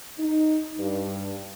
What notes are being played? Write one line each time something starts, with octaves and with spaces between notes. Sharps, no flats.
D#4
G2